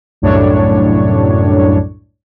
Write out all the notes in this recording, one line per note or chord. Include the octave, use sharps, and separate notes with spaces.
C2 F#2 A2 D4 C#5